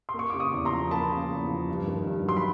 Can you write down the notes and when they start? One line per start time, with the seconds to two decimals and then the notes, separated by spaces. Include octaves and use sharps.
0.09 C6
0.14 A#3
0.19 C#6
0.30 C#3 D6
0.40 C#6 D#6
0.52 E2
0.65 A#5 C6
0.72 F3
0.91 A#3 A5 B5
1.11 C#3
1.30 E2
1.49 F3
1.69 G2
1.87 D#3
2.07 G2
2.26 F#3 C6
2.37 B5